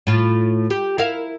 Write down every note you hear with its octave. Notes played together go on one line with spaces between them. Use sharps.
A2 F4
G4
E4 A#4 F5